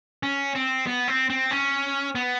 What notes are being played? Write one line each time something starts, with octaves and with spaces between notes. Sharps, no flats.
C#4
C4
B3
C4
C4
C#4
B3